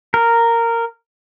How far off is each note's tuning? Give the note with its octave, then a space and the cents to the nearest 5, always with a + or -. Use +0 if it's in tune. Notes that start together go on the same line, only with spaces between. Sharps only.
A#4 -10